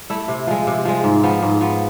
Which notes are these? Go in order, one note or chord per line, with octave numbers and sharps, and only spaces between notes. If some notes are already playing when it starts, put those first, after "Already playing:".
A3 E4
C3
F3 G#3
C3
F3 G#3
G#2
F3 B3
G#2
F3 B3